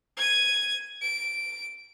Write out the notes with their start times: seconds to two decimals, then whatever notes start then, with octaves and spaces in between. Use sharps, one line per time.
0.17 G#6 D#7
1.01 D7